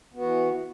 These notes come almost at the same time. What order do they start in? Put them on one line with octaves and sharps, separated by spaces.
B3 F#4 E3